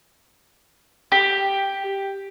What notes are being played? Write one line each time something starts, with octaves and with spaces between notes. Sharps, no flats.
G4